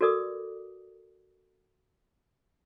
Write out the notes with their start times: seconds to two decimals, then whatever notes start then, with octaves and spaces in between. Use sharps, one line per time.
0.01 F#4 A4 A#4 D5 D6 D#6